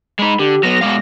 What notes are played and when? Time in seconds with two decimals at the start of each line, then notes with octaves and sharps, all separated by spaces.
0.19 G#3 D#4 B5
0.39 D3 G4
0.63 F#3 B3 A#6
0.81 B2 G#3 F5